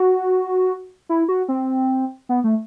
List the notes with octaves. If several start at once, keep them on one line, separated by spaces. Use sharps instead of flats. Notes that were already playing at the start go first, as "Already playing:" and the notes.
Already playing: F#4
E4
F#4
C4
B3
A3